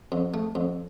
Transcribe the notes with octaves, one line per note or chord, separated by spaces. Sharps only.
F2
A3
F2